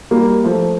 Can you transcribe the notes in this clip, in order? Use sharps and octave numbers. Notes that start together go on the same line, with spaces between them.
G3 A#3
F3 A3